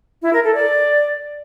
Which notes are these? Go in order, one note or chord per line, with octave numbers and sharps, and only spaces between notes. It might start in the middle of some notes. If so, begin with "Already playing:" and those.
E4
A#4
A4
D5